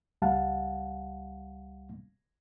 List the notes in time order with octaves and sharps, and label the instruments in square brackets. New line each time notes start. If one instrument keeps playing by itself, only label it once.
[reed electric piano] C#2 G3 F5 F#5 A5